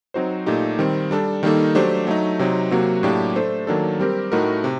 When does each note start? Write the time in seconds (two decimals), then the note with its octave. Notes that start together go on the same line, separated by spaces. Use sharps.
0.14 F#3 C4 D#4 F#4 C5
0.46 A#2 A3 D#4 G4
0.79 D#3 G3 C4
1.11 G3 D4 A4
1.43 D#3 G3 A#3 D#4 A4
1.75 F#3 A3 D4 G4 C5
2.07 F#3 A3 D#4
2.39 C3 F#3 C4 D#4
2.71 C3 F#3 A#3 F#4
3.03 A2 F#3 A#3 D4 G4
3.36 A3 D4 A4 C5
3.67 D#3 F#3 A#3 D4 A4
4.00 G3 C4 G4 A#4
4.32 A2 A3 D#4 F#4 A#4
4.64 C3